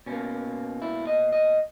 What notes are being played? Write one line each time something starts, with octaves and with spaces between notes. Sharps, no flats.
B2 A#3 C#4
E4
D#5
D#5